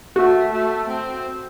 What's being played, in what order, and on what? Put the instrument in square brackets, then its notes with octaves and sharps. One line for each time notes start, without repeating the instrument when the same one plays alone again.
[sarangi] A3 [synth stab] F#4
[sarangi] A3
C4